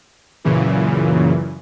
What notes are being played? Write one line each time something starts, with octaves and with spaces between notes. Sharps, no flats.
F#2 A#2 C#3 E3